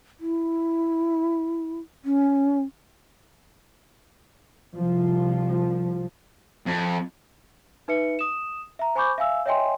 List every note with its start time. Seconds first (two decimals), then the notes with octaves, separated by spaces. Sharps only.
0.20 E4
2.05 C#4
4.74 C2 F3
6.67 F2
7.88 D#4 B4 E5 C#7
8.19 D#6 E7
8.79 E5 A#5
8.95 C5 G#5 B5 C#6 D6 G6
9.18 E5 F5 G#5 E6
9.46 C#5 D#5 E5 G5 G#5 C6